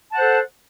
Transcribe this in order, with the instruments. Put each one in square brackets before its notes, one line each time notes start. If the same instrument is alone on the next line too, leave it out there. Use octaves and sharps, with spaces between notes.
[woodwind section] A5
F#5
C5
A4